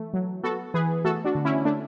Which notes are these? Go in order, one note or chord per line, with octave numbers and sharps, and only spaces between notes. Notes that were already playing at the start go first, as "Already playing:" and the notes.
Already playing: E3 A3
F#3
B3 F#4 A4
E3 G#4 B4
A3 F#4 A4
D4 F#4
D3
C#4 E4
A3 D4